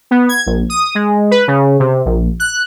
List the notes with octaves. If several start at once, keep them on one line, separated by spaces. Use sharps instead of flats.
B3
G#6
A#1
D#6
G#3
B4
C#3
C3
A#1
F#6